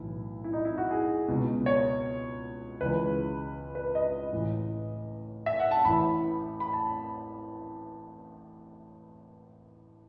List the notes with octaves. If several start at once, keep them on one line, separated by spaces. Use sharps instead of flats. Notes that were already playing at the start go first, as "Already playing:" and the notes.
Already playing: B1 A2 E3 E4
E4
D#4
E4
F#4
G#4
C#2 B2
C#5
C#2 C#3 E3 B4
B4
D#5
A1 A2 E3
E5
F#5
A5
A1 A2 E3 B5
B5
A5